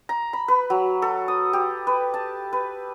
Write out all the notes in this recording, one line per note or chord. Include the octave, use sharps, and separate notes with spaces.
A#5
B5
B4
F#3
A4
D#6
G4
B4
A5
B4